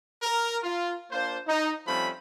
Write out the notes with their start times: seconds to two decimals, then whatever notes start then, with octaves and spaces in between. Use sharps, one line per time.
0.23 A#4
0.64 F4
1.12 A#3 D4 F4 C5
1.47 D#4
1.86 F3 G3 A3 C4 C#4 B5